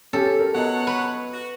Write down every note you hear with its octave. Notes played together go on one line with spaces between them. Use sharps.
C#4 G4 A4
A#4
F#3 B3 C#5 D#5 F#5 A5
B4
F#4